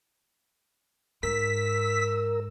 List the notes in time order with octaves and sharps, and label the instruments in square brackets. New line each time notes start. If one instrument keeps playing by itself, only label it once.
[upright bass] G#2 [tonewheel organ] A#4 [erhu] E6 [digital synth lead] B6